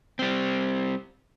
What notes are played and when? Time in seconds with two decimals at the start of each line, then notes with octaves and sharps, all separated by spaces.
0.19 G3 C4